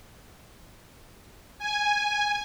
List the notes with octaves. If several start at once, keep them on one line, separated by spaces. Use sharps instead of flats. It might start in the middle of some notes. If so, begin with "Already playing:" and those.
G#5